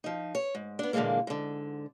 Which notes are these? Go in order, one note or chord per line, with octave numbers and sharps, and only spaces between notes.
F3 D#4
C#5
G#2
B3 D4
A#2 D3 E3 F#3 G#3 A#3
G#2 D3